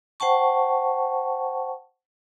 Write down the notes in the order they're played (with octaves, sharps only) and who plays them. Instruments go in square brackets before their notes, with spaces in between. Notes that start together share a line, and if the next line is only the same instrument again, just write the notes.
[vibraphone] C5 F#5 G5 A5 C#6